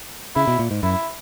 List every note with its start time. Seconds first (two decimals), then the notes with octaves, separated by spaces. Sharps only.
0.36 C#3 E4
0.48 B2
0.59 A#2
0.71 G#2
0.83 F#2 E4